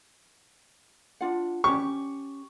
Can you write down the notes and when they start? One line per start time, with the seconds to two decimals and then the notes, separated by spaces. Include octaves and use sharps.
1.21 D4 F4 F#5
1.64 C#4 G4 C#6